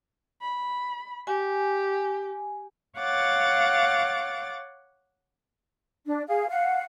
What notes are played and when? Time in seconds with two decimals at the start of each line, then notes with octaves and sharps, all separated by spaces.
0.42 B5
1.27 G4 G#5
2.98 C#5 F5 F#5 D6 A6
6.06 D4
6.27 G#4 F5
6.49 F5 F#5